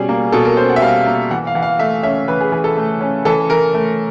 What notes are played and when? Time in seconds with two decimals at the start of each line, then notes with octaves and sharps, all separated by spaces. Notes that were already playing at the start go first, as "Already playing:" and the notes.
Already playing: B2 G3 C#4 G#4
0.09 A#3
0.32 B2 A4
0.45 A#4
0.57 C#4 C5
0.70 F#5
0.76 E5
0.82 G3 F5
1.06 A#3
1.31 E3 F#5
1.47 F5
1.55 E3 F#5
1.62 F5
1.79 A3 E5
2.03 C#4 E5
2.28 E3 B4
2.41 G#4
2.52 E3 G#4
2.64 A4
2.77 A3
3.01 C#4
3.25 E3 A4
3.50 E3 A#4
3.74 A3